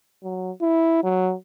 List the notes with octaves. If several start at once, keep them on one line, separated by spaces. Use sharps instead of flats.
F#3
E4
F#3